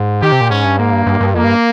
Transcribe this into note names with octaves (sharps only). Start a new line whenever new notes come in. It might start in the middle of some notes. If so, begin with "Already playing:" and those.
Already playing: G#2
D#3 G4
C3
A#2
G#2 C#4
G2
G#2 A#3
G2
G2
G2
F2 A#3
G2